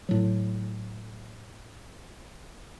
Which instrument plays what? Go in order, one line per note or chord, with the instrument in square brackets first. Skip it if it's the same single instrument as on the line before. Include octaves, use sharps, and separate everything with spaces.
[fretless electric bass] A2 F#3